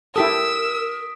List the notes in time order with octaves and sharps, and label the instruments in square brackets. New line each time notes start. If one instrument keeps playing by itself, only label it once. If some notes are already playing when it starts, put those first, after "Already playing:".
[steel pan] E4 G4 A4 [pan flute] A#4 [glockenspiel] D#6 B6 D7 [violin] E6